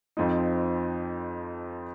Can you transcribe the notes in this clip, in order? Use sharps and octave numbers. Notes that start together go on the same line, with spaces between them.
F2 F3 C4 D#4